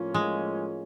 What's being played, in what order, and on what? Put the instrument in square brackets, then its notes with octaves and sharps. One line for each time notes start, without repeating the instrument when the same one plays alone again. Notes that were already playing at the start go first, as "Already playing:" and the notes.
Already playing: [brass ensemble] A2 F3 A#3 C#4 F4
[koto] G#3